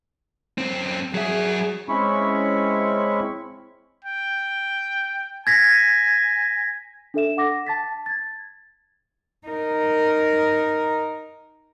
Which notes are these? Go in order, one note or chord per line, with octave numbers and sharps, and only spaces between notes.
F#2 C4
F#3 G#4 E5
G#3 C4 C#4 E4 B5 C#6
G5
G#5 G#6 A#6 B6
D4 A4 E5 E7
F#5 D6 A#6
A5 A6 B6
G#6 A6
D#4 A#4